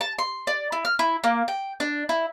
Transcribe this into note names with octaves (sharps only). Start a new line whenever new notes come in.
A5
C6
D5
E4
F6
E4
A#3
G5
D4
E4